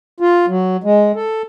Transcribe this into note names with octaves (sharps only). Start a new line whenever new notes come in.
F4
F#3
G#3
A4